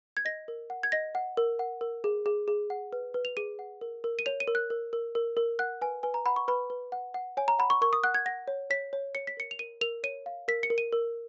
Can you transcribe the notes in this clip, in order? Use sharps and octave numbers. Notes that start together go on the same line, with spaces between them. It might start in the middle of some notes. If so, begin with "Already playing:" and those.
G#6
D#5 A#6
A#4
F#5
G#6
D#5 A#6
F#5
A#4
F#5
A#4
G#4
G#4
G#4
F#5
B4
B4
F7
G#4 D#7
F#5
A#4
A#4
D#7
C#5 F7
D#7
A#4
F#6
A#4
A#4
A#4
A#4
F#5 F#6
B4 G#5
B4 G#5
A#5
F#5 B5
C#6
B4 B5
B4
F#5
F#5
C#5 G#5
A#5
F#5 B5
C#6
A#4 C#6
D#6
F#5 F#6
G#6
F#5 A#6
C#5
C#5 B6
C#5
C#5 C#7
B6
A#4 C#7
F7
A#4 D#7
A#4 F7
C#5 D#7
F5
A#4 B6
C#7
A#4
D#7
A#4